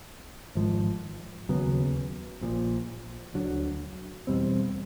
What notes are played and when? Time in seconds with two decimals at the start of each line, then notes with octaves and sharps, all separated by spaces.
0.55 G#1 G#2 F3
1.49 D#2 C#3 F#3 B3
2.41 A#1 A#2 F3
3.34 D2 D3 F#3
4.27 E2 B2 G3 C4